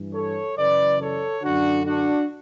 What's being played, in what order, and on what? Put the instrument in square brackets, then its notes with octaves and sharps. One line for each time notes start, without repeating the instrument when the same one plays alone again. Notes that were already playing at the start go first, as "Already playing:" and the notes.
Already playing: [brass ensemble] G2 E3
A4 C#5
F#2 C#3 E3 B4 D5
A4 C#5
F#2 D3 D4 F#4
D4 F#4